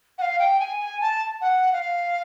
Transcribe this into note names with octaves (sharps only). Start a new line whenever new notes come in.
F#5
F5
G5
G#5
G#5
A5
F#5
F5